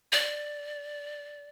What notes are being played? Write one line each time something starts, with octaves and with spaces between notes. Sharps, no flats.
D5